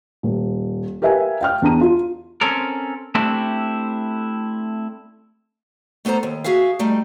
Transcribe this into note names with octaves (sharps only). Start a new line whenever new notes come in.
D#1
G4 A#4 B4 E5 F5 G#5
F5 G5 F6
E2 D4 A#5 D#7
F4
C4 C#4 A4 A#4
A3 C4 D4 E4 G4
A3 B3 A4 C5 A#5
D#2
F#4 G#4 E5 F5
G3 A3 D#4